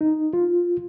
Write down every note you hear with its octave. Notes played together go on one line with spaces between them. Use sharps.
D#4
F4